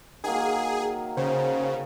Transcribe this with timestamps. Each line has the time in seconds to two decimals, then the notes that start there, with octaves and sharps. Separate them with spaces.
0.24 D#3 F#3 A#3 G#4
1.17 C#3 C5